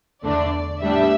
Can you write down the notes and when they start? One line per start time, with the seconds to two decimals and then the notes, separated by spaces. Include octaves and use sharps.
0.23 E2 D3 A3 D4 D5
0.81 A2 G3 B3 D4 E5